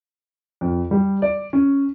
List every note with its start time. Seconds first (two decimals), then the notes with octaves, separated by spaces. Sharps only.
0.61 F2
0.91 G3
1.22 D5
1.53 C#4